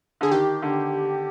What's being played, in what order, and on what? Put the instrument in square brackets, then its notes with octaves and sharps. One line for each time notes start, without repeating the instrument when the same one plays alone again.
[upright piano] D3 [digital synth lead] G#4
[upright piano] D#3 [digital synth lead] G4
[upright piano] D3